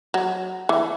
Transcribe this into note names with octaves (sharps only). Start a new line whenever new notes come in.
F#3
E3